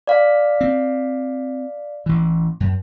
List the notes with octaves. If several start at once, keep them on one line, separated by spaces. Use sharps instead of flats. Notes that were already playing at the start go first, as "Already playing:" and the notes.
D5 F5
C4
A1 E3
F#2